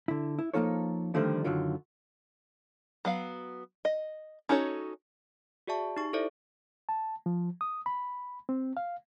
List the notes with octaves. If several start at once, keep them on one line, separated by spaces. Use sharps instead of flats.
D3 E4
E4
F3 A#3 D#4 F4 A4 C#5
D3 D#3 F3 G3 A3 D4
F#2 D3 D#3 F#3 F4
F#3 B3 F5
D#5
C#4 D#4 F#4 A4 C#5
F#4 G#4 D5 E5 A5 C#6
D#4 G4 C#6
E4 A4 C5 D5 E5
A5
F3
D#6
B5
C4
F5